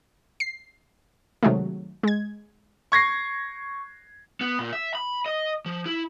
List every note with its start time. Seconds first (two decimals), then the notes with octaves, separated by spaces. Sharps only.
0.40 C7
1.43 C3 D#3 F#3 G#3 A3
2.03 G#3 G#6
2.92 C#6 G#6 A#6 C7
4.41 B3
4.59 A#2
4.73 E5
4.95 B5
5.26 D#5
5.66 F3
5.86 E4